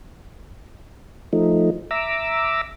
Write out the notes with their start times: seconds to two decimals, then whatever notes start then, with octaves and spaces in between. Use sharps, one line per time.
1.33 F3 A3 D#4
1.91 E5 A#5 D6 E6